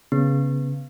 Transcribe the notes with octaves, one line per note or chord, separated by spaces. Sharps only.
C#3 B3